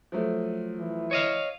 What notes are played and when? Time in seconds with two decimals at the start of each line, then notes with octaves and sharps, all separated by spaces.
0.12 F3 F#3 A3
0.79 E3
1.11 C#5 D#5 F5